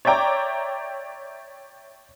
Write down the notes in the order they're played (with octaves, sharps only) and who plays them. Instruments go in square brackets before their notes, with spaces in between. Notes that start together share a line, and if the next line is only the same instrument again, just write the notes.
[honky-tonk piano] C#5 D5 E5 G5 A#5 D6